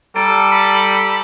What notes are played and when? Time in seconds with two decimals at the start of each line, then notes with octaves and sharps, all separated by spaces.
0.16 G3 A4 A#5 A6 D7
0.52 B5